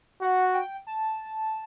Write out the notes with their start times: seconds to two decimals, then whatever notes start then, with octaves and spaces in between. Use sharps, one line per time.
0.22 F#4 F#5
0.54 G5
0.87 A5